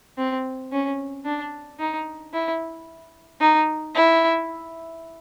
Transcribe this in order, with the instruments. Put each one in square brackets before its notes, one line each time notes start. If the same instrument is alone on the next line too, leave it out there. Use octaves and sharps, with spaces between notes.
[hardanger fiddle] C4
C#4
D4
D#4
E4
D#4
E4